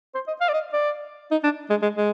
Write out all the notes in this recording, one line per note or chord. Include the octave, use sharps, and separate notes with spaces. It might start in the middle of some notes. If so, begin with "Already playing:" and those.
C5
D#5
F5
D5
D#5
D5
D#4
D4
G#3
G#3
G#3